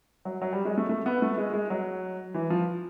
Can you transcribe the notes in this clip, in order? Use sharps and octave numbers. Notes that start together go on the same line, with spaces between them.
F#3
F#3
G3
G#3
A3
A3
B3
A3
G#3
G#3
F#3
E3
F3